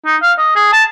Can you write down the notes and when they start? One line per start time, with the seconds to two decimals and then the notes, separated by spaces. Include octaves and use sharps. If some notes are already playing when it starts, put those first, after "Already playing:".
0.06 D#4
0.22 F5
0.38 D#5
0.56 G#4
0.73 A5